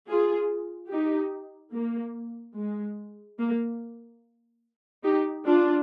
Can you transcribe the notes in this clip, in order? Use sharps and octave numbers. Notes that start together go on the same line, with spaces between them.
F4 G#4
D#4 G4
A#3
G#3
A#3
D#4 G4
D4 F4